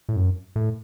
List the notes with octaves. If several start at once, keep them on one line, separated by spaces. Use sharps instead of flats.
A2
F#2
A2